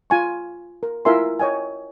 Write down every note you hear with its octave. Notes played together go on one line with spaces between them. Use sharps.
F4 G#5 C#6
A#4
E4 F4 A#4 E5 G#5 C6
C#5 D#5 G5 G#5